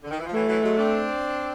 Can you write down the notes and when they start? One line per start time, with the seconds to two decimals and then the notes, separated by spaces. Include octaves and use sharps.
0.04 D3
0.11 D#3
0.18 E3
0.26 F3
0.33 E3 F#3 A3
0.48 E3 F#3
0.62 F#3 G#3
0.76 C4 D4